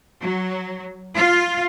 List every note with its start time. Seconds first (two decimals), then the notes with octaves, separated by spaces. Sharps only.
0.21 F#3
1.16 F4